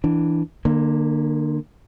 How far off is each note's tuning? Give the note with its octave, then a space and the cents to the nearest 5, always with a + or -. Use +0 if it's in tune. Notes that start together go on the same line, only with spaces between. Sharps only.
E3 +0 D4 +0
D3 +35 A#3 +0